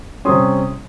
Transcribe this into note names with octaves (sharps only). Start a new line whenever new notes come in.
C3 G3 C#4 C6 D#6